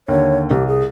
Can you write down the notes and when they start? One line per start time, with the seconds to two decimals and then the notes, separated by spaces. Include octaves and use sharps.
0.08 D#2 D3 C#5
0.51 C2 G4
0.68 G#4